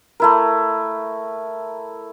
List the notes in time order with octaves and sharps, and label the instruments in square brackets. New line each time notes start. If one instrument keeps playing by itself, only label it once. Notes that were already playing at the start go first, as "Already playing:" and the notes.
[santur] A3 E4 A#4